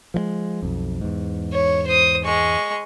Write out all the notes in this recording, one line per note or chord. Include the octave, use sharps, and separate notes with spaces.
F3 F#3 G#3
B1 F2
E2 G#2
C#5
C5 D#6
G#3 C#6